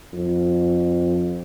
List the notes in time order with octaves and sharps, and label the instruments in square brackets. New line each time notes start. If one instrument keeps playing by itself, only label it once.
[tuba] F2